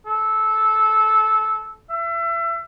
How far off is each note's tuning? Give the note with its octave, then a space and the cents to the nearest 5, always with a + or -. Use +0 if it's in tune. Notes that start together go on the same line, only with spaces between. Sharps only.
A4 -15
E5 +30